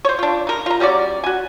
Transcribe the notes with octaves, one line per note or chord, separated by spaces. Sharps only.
C5 C#5
D4 F4
D#4 A#4
F4 A#5
G3 C#4 F#4 D5
F#4 G#5